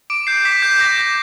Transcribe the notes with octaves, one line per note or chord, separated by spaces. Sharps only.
D6 D7
G6 C7
C7
D6 B6
G6
D6 A#6
G6